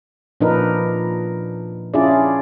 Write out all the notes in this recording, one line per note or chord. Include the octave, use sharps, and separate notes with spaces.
A#2 F3 D4 D#4 A#4 B4
C#4 D4 E4 F4 G#4 D5